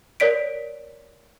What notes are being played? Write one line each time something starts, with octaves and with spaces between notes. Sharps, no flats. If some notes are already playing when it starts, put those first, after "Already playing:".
A#4 C#5 D5 B6 D7